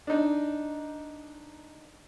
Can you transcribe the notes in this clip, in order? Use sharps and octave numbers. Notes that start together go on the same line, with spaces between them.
D4 D#4